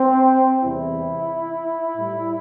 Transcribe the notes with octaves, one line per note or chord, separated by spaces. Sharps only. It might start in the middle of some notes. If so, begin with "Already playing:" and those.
Already playing: C4
E2 C3 G3 E4
A2 G3